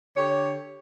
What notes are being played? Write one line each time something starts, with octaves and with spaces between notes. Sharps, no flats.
D3 G4 C#5